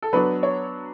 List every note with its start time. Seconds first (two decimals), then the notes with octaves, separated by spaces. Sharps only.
0.02 A4
0.13 F#3 B3 D4 B4
0.43 C#5